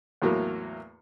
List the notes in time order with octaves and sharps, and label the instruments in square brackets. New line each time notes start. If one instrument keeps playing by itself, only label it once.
[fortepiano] E2 A2 F#3 A#3